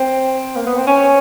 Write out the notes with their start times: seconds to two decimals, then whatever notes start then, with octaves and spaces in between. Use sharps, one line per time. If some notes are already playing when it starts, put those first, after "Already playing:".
Already playing: C4
0.56 A#3
0.66 B3
0.77 C4
0.87 C#4